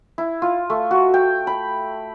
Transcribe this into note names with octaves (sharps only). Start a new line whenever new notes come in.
E4
F4
A3
F#4
G5
B5